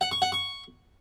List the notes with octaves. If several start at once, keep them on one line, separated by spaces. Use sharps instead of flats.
F#5
C#6
F#5
C#6